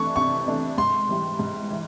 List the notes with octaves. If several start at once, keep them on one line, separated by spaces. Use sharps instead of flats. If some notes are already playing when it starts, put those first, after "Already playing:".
Already playing: C3 E3 A3 D4 C#6
C3 C#6
E3 A3 D4
G#2 C6
E3 G3
G#2
E3